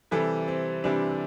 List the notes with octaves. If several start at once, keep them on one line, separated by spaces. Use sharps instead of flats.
C3 E3 G3 A4
C4
C3 E3 G3 D4